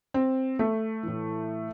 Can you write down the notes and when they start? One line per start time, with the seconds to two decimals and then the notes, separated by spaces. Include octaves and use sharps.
0.14 C4
0.59 A3
1.03 A2 E3